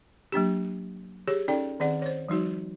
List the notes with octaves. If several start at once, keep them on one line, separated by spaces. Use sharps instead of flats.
F#3 A#3 D4 G4
G4 G#4 C#5
C#4 D#4 A4 D5 G5
D#3 C4 G#4 D5 F#5
C5 C#5
F3 G3 D#4 F#4